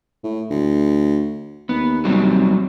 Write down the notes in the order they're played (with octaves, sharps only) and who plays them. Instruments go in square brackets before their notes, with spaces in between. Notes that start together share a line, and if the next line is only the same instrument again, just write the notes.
[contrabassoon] A2
D2
[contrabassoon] D#2 [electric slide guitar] B3
[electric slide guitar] F#3 G3 C4